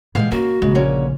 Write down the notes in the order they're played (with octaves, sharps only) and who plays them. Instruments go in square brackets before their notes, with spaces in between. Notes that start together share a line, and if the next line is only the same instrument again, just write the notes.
[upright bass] A#2 E3 [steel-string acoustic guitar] G3 G#3 F5
[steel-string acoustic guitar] A#3 [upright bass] C#4 [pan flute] F#4
[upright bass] A#1 C#3 [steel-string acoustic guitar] G#3
[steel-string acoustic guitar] D3 A#3 C#4